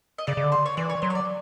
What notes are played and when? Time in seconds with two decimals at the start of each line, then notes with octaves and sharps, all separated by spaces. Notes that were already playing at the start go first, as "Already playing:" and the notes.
0.18 D#5
0.27 C#3 D5
0.37 C#3
0.44 D3
0.52 C5
0.66 C#5
0.77 E3 D5
0.90 C#5
1.02 F#3 C5
1.10 C#5
1.15 D5